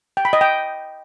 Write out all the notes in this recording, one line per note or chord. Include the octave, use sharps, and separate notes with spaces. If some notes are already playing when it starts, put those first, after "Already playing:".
G5
B5
D#5
G5